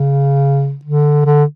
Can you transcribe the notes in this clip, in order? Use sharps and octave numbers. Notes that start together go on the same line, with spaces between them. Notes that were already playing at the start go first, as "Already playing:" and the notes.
Already playing: C#3
D3
D3